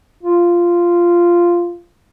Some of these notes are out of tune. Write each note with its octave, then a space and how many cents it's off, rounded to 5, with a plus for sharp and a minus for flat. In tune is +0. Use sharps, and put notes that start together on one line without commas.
F4 -10